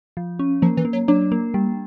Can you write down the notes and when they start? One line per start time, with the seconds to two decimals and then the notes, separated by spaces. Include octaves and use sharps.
0.17 F3
0.39 C#4
0.62 F3 A#3
0.77 E3
0.85 A#3
0.93 F#3
1.08 F#3 D4
1.32 A#3
1.54 G3